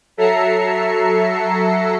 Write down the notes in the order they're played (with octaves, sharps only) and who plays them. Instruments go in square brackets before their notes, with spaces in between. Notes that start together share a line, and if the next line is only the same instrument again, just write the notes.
[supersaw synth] F#3 A4 E5 A#5 C7 C#7